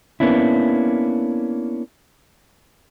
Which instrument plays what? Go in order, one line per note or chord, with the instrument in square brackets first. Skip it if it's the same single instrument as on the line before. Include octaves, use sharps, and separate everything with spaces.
[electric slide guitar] A#3 B3 C#4 D4 E4